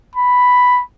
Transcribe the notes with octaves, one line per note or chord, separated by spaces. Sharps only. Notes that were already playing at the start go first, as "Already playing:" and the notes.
B5